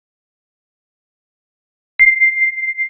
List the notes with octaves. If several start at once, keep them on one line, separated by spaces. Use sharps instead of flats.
C7